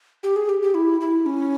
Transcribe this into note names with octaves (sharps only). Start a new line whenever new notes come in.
G4
G#4
G4
G4
E4
E4
C#4